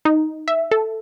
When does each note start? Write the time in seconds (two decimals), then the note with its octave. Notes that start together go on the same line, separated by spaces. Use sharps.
0.05 D#4
0.48 E5
0.71 A4